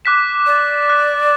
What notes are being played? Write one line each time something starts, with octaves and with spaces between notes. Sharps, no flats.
D6 F#6 B6 E7
D5
D6 F#6 B6 E7